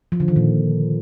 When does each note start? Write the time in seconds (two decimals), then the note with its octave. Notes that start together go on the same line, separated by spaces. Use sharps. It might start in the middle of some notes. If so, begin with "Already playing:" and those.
0.12 F3
0.20 D3
0.28 D#3
0.36 A#2